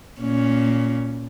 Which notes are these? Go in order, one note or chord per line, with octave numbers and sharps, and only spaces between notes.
A#2 C#4